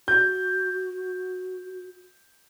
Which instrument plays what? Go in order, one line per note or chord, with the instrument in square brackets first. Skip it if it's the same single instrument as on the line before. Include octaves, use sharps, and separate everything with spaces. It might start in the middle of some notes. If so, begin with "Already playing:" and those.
[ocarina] F#4 [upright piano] G6